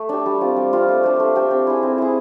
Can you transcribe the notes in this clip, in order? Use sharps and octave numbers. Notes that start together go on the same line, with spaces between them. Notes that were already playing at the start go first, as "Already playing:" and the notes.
Already playing: A3
D4 G4
G3
C4 F4
G3
C4 F4
A3
D4 G4 C5
A3
D4 G4 C5
C4
E4 G#4
C4
E4 G#4